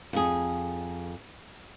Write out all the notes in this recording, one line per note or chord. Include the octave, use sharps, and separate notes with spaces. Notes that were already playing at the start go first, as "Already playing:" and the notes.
F2 G#4